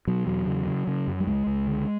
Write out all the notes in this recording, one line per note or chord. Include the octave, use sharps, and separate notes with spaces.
B2 F#3
E2 F#3
C#3
C#3
C#3
F#2
G3
C#2 G#3
C#2
D3